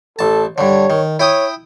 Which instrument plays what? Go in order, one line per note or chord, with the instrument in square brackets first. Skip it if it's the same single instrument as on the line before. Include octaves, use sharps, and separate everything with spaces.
[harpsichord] A1 A5 [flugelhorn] A4
[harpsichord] G2 D3 [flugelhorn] C#5
[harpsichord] D#3
[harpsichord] E4 G5 D#6 [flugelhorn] C#5